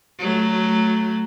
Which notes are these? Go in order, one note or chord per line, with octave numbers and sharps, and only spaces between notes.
F#3 A3